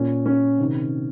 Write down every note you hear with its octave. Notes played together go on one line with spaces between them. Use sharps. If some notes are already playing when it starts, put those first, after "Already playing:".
Already playing: A#2 C#4
C#4
C3 D#3